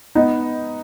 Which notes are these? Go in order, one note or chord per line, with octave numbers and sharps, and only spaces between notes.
B3 D#4